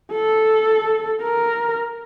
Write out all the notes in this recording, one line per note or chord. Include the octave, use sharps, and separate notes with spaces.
A4
A#4